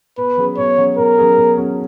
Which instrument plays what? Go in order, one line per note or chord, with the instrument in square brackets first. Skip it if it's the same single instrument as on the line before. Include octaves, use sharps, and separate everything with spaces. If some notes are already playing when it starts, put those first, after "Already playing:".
[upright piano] B2 [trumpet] B4
[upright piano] F#3 C#4 G#4
[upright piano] B2 [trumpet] C#5
[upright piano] F#3 C#4 G#4
[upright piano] B2 [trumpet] A#4
[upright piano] F#3 C#4 G#4
B2
F#3 C#4 G#4